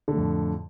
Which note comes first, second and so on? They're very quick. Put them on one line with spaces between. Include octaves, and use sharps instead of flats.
D3 A2 F2